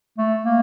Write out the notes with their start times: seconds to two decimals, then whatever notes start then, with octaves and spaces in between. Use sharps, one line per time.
0.18 A3
0.43 A#3